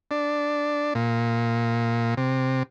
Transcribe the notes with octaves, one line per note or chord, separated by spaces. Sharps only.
D4
A#2
C3